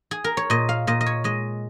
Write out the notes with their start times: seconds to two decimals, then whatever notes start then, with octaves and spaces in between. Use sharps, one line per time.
0.11 G#4
0.24 A#4
0.37 C#5
0.50 A#2 D#5
0.69 F5
0.87 A#2 D#5
1.01 D#5
1.06 C#5
1.24 G#3 D#5